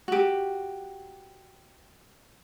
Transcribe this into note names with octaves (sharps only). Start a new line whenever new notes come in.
F#4 G4